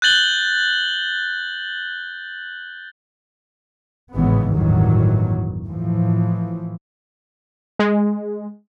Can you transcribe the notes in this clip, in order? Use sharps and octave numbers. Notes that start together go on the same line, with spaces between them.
F#6 G6 A6 F#7 G7
G#1 A2 C#3 E3 G#3 B3
G1 E2 A2 D#3 E3 F#3
A2 E3 F3
G#3